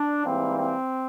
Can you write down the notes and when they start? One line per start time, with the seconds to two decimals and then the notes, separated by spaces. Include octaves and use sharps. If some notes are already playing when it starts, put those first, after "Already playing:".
Already playing: D4
0.24 G#2 E3 G3 A#3 C4
0.56 C4